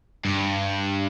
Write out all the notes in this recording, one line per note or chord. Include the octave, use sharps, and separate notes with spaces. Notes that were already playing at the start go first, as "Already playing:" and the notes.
G2